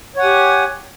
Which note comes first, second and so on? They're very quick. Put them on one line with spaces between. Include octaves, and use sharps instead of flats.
C#5 F#5 G#5 G4